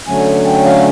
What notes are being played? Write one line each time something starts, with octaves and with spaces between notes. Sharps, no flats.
D3 F#3 A3 C#4 G#5
G5
F5